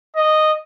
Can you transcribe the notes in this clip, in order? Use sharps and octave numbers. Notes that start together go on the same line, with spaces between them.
D#5